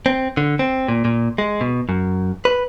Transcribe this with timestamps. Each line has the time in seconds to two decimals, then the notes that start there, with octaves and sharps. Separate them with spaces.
0.06 C4
0.37 D3
0.59 C4
0.88 A#2
1.05 A#2
1.38 G#3
1.61 B2
1.89 F#2
2.45 B4